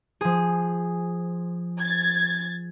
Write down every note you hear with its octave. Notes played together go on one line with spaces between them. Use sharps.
F3 G#4
G#6 A6